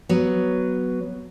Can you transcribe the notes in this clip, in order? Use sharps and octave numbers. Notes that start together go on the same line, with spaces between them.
F#3 B3